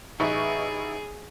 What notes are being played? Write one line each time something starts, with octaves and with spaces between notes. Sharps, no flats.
A1 D#4 G#4 B4 E5 C#6